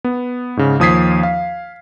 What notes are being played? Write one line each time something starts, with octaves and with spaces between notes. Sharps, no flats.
B3
G#2 C#3
D#2 F3 D#6 G#6 B6 C7
F5